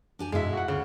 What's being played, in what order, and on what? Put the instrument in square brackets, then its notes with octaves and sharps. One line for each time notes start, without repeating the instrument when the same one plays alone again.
[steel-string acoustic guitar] D4 G4 G#5
[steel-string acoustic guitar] G2 B2 E4 [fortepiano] G#3 E5
[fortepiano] F#4 F#5
[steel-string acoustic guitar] D2 [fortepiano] C#3